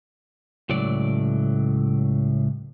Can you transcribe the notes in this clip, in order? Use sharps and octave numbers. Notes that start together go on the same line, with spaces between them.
C#2 A2 F#3 A3 D5